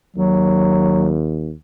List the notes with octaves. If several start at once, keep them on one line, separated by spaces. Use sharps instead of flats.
D#2 F#3